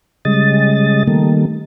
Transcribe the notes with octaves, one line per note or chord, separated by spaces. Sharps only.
C#3 G3 G#3 D#5 A6
D#3 G3 A3 A#3